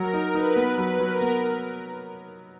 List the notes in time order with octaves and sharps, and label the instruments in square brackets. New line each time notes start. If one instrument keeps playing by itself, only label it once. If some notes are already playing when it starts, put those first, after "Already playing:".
Already playing: [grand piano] F#3 [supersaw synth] A#4
[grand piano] D#4
[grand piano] D#4 [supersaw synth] B4
[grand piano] B3
[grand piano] F#3 [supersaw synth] B4
[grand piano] F#3
[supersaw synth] A#4
[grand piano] B3